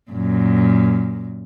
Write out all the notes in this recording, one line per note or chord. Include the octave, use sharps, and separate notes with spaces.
F#2 A#2